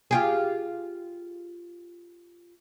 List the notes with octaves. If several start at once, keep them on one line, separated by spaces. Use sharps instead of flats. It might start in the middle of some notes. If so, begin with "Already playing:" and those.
F4 G4 G#4